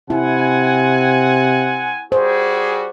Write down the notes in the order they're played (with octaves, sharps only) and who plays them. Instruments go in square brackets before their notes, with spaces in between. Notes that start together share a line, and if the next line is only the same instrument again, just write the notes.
[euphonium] C3 [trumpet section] C4 F#5 G#5 [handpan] E4
[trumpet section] G3 F#4 G#4 [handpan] C5